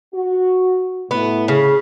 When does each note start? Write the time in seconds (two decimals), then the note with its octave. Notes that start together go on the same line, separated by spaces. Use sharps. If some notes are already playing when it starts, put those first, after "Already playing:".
0.14 F#4
1.11 A2 A3 B3
1.48 C#3